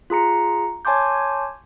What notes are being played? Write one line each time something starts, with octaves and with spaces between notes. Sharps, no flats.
F4 G#4 A#5 C#7
C#5 G#5 A5 C6 D6 G6